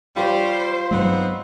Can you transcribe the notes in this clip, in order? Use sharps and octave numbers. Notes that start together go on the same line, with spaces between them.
G3 F4 C5 C#5
G2 F#3 G#3 B3 C4 D#4